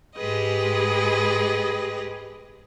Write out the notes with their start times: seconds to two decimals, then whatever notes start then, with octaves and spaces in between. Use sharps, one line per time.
0.16 G#2 G#3 G4 G#4 B4 D#5